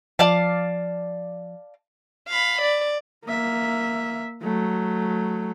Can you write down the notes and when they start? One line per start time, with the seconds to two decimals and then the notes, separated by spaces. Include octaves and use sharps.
0.19 F3 D5 F5 A5
2.28 F5 B5
2.61 D5
3.25 A#3 E5
4.42 F#3 A3